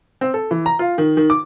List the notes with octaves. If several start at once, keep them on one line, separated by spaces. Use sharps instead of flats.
C4
A4
E3
A#5
F4
D#3
D#3
D6